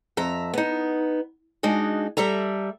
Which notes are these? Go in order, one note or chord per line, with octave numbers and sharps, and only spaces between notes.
F2 E5 A#5
B3 D#4
G#3 D4 D#4 F#4
G3 A4 E5 A#5